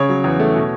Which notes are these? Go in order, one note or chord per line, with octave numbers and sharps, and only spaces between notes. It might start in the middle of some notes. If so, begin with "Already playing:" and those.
Already playing: C#3 C#5
F#3
E2
A3
B2